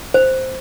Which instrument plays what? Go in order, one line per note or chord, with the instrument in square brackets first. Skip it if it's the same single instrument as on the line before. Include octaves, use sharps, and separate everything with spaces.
[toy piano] C5